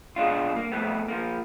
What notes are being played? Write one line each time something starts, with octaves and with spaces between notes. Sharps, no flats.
B2 G#3 D4 F4
A#3
F2 A2 A3 B3
F3 A#3